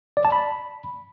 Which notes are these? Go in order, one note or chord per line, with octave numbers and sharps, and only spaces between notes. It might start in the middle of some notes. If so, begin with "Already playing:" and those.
D5
A5
B5